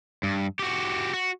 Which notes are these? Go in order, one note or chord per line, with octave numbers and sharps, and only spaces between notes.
G2
F#4 G4
F#4